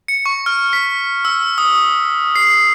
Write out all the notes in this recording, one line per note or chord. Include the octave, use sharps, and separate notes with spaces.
C#7
C#6
F6
B6
E6
D#6
C7